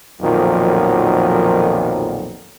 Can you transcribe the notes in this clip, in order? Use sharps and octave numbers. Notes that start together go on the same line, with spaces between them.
B1 F2 A#2 D#3 F3 F#3